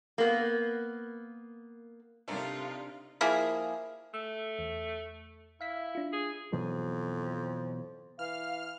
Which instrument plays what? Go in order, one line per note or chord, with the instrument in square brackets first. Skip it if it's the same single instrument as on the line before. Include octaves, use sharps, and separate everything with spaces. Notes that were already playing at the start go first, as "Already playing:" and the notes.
[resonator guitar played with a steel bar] A#3 B3
[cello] C3 [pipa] D#3 A3 C4 [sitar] D4 [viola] D#4 F4
[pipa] F3 A#3 E4 G#4
[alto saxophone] A3 [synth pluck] E6
[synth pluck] E2
[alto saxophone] E4 [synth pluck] F5 B6
[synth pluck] D4 F4
[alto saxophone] G#4
[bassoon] F2 [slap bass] B2 E3 F#3
[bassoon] E3 [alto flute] F5 [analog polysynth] F6